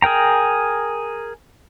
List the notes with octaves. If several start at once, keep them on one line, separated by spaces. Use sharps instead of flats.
G#4 A#4 G5 A#5